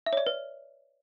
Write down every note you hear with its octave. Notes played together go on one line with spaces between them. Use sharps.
E5
C#5
D5
B4